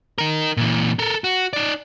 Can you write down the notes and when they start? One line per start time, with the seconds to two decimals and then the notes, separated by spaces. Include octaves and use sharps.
0.18 D#4 A#4
0.57 A#2 E3
0.99 A4 A#4
1.24 F#4
1.53 D#4 D5